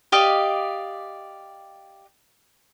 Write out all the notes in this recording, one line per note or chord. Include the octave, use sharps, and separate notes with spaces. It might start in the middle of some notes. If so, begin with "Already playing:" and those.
G4 D5 D#5 F5